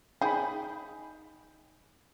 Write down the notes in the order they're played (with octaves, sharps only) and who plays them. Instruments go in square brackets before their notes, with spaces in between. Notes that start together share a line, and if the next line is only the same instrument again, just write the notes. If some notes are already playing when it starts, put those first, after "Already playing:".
[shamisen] D#4 G#4 [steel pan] G5 B5